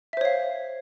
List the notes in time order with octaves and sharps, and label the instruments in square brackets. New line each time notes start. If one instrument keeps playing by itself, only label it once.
[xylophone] E5
C5
C#5
F5